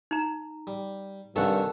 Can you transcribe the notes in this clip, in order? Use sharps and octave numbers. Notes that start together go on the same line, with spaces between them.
D#4 A#5
G3
G2 C3 D#3 C#4 A4 F#5